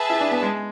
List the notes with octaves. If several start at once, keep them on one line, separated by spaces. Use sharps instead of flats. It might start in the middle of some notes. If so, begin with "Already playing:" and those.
Already playing: G#4 B4 E5 A5
E4
D4
B3
G#3